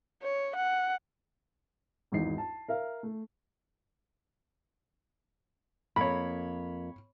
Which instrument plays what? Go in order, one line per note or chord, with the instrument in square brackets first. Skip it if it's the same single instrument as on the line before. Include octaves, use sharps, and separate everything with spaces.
[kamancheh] C#5
F#5
[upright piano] G#1 E2 D#4 C7
A5
A#4 E5 F5
A3
[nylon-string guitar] F2 A#3 [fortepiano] C#5 B5